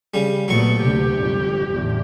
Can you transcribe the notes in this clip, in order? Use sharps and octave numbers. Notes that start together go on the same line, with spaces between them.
C#3 G3
A#1 A#2 F#3 A3 B3 C#6
D2 C3 G4
G1 F2
A1 E2 D3